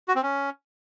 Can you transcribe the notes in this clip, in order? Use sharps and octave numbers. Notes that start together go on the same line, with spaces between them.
F#4
C4
C#4